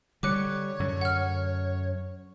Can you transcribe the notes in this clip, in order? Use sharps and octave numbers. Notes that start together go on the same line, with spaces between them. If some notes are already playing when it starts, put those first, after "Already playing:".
D3 G3 C#5 D6 F#6 C#7
F#2 D3
F#5 F6